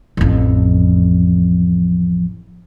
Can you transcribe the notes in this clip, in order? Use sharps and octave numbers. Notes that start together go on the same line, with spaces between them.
A1 F2